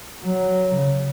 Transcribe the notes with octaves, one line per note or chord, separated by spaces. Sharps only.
F#3
C#3